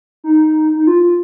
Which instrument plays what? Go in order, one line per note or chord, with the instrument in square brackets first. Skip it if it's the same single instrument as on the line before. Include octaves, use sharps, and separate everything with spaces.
[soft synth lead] D#4
D#4
F4
F4